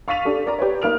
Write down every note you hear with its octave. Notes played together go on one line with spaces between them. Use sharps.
F5 C#6 A6 B6 D#7 F7
D4 G4 A4
A#4 D5 A#5
G4 B4 C#5
A#3 D#4 A#4 F6 D7 F7